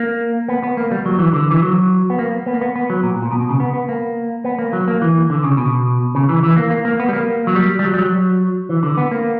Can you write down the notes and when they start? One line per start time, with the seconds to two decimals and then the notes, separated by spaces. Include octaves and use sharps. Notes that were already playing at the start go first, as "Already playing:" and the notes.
Already playing: A#3
0.48 B3
0.63 B3
0.77 A#3
0.91 G3
1.06 F#3
1.19 E3
1.33 D3
1.51 E3
1.62 F#3
2.10 B3
2.19 A#3
2.46 B3
2.54 A#3
2.61 B3
2.76 B3
2.90 F#3
3.03 A#2
3.22 A#2
3.31 B2
3.41 B2
3.50 C#3
3.60 B3
3.73 B3
3.89 A#3
4.44 B3
4.59 A#3
4.73 F#3
4.88 A#3
5.02 E3
5.30 D3
5.44 C#3
5.57 B2
6.15 C#3
6.29 E3
6.43 E3
6.57 A#3
6.70 A#3
6.85 A#3
7.00 B3
7.09 G3
7.13 A#3
7.47 F#3
7.56 G3
7.79 G3
7.85 F#3
7.94 G3
7.98 F#3
8.69 E3
8.83 D3
8.97 B3
9.11 A#3